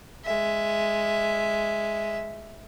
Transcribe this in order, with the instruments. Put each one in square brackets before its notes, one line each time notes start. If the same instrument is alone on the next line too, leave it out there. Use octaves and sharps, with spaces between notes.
[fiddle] G#3 E5